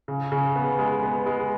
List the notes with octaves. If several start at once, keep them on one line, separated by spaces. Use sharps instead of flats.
C#3
C#3
B3
G#3
B3
G#3